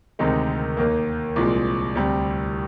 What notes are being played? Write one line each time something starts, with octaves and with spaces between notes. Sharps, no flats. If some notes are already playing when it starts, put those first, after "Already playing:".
D2 C3 D#3 G#3 D#4
D#2 D#3 A#3
C2 A#2 F3 G#3
D2 C3 G3